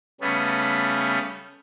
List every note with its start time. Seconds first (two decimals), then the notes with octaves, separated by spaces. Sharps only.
0.21 C#3 G3 A3 B3 C#4